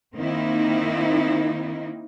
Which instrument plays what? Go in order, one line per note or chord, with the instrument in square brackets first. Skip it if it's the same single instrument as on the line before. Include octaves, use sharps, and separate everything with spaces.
[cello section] D#3 A#3 C4 D#4 E4